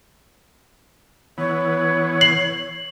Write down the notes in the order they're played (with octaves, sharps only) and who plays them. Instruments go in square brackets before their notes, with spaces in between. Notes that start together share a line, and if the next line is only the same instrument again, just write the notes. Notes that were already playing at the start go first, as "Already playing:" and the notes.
[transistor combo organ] E3 B3 [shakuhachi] C#5
[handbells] C7 [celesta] F#7